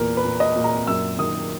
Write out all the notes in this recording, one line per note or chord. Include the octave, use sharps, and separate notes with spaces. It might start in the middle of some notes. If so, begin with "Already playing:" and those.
Already playing: E2 A#2 A#4
B4
A#2
D#5
A#2
A#5
F#2 E6
D#3 D#6